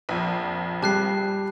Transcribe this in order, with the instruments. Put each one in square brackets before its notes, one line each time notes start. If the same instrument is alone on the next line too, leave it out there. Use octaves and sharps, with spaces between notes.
[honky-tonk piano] A#1 F2
[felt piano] G3 G4 [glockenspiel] A5 F#6 C7